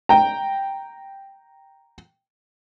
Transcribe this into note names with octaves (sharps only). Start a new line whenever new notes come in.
G5 A#5